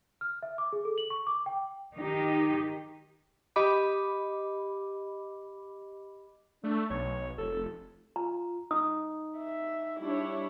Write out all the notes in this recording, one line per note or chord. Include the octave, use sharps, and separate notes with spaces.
F6
E5
D6
G#4
A4
F#7
C#6
D6
G5
D#3 D#4 G4
G4 D#5 B5 D6
A3 D4
B1 C#5
F1 A4
F4 A#5
D#4 D#6
E5
G3 D4 E4 C#5